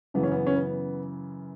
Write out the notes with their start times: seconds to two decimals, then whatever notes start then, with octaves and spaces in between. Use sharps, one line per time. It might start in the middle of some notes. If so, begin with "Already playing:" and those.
0.14 F#2 C#3 E3 B3
0.23 C#4
0.32 B3
0.47 C#4
0.56 B3